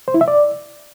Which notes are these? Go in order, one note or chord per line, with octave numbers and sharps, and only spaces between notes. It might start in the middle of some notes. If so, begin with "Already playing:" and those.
C5
E4
E5
D5